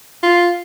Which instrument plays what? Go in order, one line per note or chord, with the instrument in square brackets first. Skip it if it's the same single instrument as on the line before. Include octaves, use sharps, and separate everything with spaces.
[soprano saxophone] F4